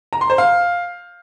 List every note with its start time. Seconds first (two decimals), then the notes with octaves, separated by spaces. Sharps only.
0.13 A#5
0.21 C6
0.30 C5
0.38 F5